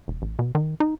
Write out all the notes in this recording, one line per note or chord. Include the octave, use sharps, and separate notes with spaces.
E1
A1
B2
D#3
D#4